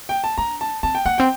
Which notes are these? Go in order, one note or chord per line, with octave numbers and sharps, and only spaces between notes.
G5
A5
D4 A#5
A5
C4 A5
G5
A#3 F#5
C4 G5